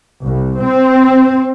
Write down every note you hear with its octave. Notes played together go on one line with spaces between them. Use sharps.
C2
C4